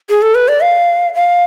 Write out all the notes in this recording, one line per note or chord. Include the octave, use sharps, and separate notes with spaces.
G#4
A4
B4
D5
F5
F5